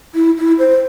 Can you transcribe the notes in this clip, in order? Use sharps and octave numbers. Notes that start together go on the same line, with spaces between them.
E4
E4
C5